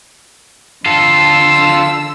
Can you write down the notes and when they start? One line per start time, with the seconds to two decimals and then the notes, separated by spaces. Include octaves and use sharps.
0.85 D3 F4 A4 E6